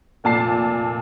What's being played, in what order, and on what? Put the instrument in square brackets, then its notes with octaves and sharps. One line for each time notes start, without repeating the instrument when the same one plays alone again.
[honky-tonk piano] F1 A#2 A5 C7